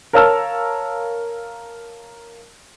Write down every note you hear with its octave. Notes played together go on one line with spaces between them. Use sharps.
A#4 C#5 F5 A5 E6 F6